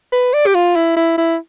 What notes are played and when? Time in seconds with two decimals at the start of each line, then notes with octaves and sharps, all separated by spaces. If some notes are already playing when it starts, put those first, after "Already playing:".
0.12 B4
0.34 D5
0.47 G4
0.55 F4
0.76 E4
0.96 E4
1.18 E4